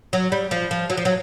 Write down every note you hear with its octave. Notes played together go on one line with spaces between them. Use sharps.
F#3
G3
F3
F3
F#3
F3
F#3